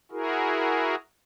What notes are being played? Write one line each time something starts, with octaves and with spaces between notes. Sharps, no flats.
E4 F#4 G#4 A#4